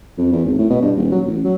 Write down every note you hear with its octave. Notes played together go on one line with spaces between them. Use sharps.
F2
E2
G#1
A2
B2
G2
D#1
F#3
A1
F#3